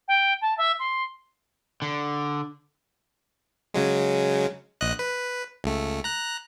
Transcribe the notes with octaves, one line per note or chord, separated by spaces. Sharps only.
G5
A5
E5
C6
D3
C#3 F#3 G#3
A#1 D#5 F#6
B4
C#2 A3
A#5 F#6